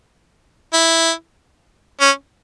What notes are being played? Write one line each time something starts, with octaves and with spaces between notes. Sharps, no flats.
E4
C#4